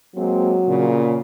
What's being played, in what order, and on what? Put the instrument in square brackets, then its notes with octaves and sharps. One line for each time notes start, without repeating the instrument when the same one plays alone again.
[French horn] F#3 [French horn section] G#3 A#3 C4
[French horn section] A#2 C#3